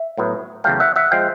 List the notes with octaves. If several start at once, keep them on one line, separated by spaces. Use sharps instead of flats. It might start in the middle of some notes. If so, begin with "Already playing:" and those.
Already playing: E5
A2 F#3 B3
E2 C#3 F#3 A3 F5 G5
E5 F#5
E5 F#5
F3 G#3 F5 G5